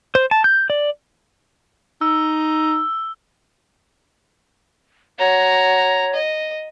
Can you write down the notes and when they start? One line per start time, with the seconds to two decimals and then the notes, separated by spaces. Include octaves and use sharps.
0.15 C5
0.31 A5
0.44 G6
0.70 D5
2.01 D#4 E6
5.19 F#4 C#5 A#5
6.14 D#5